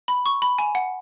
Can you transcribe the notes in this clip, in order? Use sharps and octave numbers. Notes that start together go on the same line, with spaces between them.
B5
C#6
B5
G#5
F#5